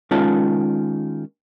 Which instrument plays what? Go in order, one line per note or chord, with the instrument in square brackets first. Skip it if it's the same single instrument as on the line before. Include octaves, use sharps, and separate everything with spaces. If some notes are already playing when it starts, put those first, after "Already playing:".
[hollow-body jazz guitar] D#3 G#3 C#4 F4 A5